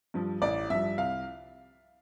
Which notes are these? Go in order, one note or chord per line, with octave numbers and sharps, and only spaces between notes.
G2 F3
A1 D5
G2 F3 E5
C2 F5